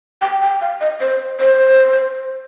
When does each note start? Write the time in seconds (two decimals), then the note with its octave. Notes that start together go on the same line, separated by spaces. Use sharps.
0.22 G5
0.42 G5
0.61 F5
0.81 D#5
1.01 C5
1.40 C5